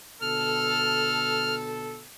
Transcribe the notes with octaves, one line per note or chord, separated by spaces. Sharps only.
B2 D3 A4 F6